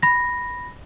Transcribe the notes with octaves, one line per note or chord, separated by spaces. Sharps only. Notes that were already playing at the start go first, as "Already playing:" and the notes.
B5 A#6